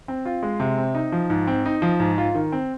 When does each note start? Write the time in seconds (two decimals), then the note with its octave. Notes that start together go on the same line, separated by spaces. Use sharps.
0.08 C4
0.25 F4
0.43 G#3
0.60 C3
0.78 C4
0.95 D#4
1.12 F3
1.30 G#2
1.47 C4
1.66 D#4
1.82 F3
2.00 G#2
2.18 F4
2.35 D#3
2.52 C4